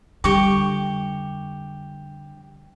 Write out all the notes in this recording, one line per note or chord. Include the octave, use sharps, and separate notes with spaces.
F2 D3 G3 G4 C#6 D6